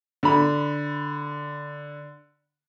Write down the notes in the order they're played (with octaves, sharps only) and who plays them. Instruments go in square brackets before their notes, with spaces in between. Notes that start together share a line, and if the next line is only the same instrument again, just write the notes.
[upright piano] D3 B5